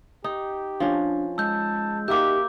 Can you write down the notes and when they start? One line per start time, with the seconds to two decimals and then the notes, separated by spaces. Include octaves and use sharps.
0.24 D#4 G4
0.80 F3 C#4 D4
1.38 G#3 A5 E6 G6
2.08 A#3 D#4 F#4 G4 E5 D6 G6